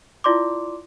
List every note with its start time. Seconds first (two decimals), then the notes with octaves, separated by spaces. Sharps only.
0.24 E4 F4 D5 C6 D6